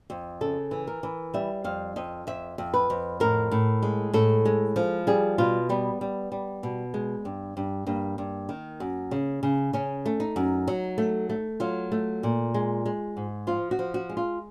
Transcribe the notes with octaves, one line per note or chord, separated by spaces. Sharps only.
F2
C#3 A4
E3
A#4
E3
G3 E5
F2 F5
F2 D#5
F2 E5
F2
B4
F2
A2 A#4
A2
G#3
A2 A4
G#3
F3
G3 G#4
B2 F4
G3 B3
G3
G3
B2
G#3
G2
G2
G2 A#3
G2
D#3
F#2
C#3
C#3
C#3 C#4
A3
D#4
F#2
F#3
A3
A3
F#3 F4
A3
A#2
G#3
G#3
G#2
F3 F4
F#4
F3
F#4
G#3
F4